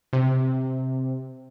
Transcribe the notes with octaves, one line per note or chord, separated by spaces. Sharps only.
C3